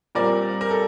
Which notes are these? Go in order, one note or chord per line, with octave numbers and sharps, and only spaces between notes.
A#2 G3 C4 A#4 D5
A#4
A4